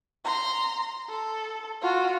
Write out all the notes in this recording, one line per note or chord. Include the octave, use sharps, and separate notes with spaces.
A#5 C6
A4
F4 F#4